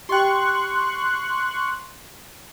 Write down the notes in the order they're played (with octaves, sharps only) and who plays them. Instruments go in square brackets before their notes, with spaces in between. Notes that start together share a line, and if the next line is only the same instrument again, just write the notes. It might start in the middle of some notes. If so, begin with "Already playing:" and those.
[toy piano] G4 D#5 G5 [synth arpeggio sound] C6 F#6 [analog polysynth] C#6